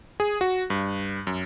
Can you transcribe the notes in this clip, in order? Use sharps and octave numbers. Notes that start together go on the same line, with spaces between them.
G#4
F#4
G2
F#2